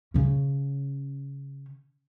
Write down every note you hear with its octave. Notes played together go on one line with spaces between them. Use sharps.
C#3 C#4